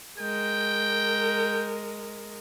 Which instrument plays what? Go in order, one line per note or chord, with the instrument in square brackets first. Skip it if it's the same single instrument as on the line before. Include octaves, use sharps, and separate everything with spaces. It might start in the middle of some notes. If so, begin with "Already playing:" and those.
[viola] G#3 A#4 [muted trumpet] G5